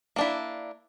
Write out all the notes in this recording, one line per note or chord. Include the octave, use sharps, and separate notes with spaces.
A#3 D4 E4